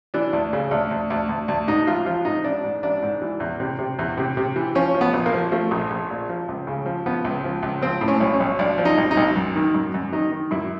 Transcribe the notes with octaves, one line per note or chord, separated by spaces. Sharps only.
E3 D4
D2
C#3
D2
D2
D2
D2
D2
G#2 D#4
A1 F4
F3 F4
G#2 D#4
A1 D4
G#2
A1 D4
G#2
E3
E2
C3
C3
E2
C3
C3
E3
F3 C#4
F3
B3
A#1
A#3
F3
F3 A3
A#1
A#1
A#2
F3
C#2
C#3
F3
F3 B3
C#2
F3
C#2
F3 C4
A2
C#4
B1
C#4
B1
B1 D4
F3
D#4
B1
D#4
B1
F#2
D#3
F#2
F#2
D#3 D#4
D#3
F#2 E4